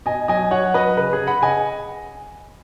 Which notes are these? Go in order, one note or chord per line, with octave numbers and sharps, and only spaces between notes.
B2 D#5 G#5
F#3 D#5 G#5
F#3 C#5 F#5
F#3 B4 D#5
C#3 B4
G#4
C#3
F#5 B5
C#3 D#5 G#5